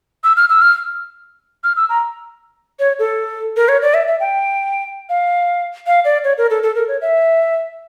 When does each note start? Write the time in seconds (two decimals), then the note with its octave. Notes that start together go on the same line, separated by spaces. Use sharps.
0.24 E6
0.37 F6
0.49 E6
0.62 F6
1.64 F6
1.77 E6
1.89 A#5
2.79 C#5
2.99 A4
3.57 A#4
3.68 C#5
3.82 D5
3.94 E5
4.07 E5
4.20 G5
5.09 F5
5.87 F5
6.05 D5
6.24 C#5
6.38 A#4
6.50 A4
6.63 A4
6.75 A#4
6.88 C#5
7.02 E5